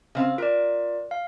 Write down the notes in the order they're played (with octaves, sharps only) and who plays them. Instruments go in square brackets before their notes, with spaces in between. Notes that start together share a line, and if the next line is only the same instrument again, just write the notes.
[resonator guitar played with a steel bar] C#3 C4 F5
[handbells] F4 D5 [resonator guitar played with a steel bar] A#4
[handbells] F5